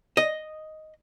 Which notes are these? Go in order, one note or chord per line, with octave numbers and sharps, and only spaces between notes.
D#5